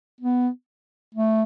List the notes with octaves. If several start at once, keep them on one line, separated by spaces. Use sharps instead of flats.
B3
A3